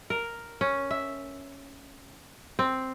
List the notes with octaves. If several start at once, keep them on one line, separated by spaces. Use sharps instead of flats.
A#4
C#4
E5
C4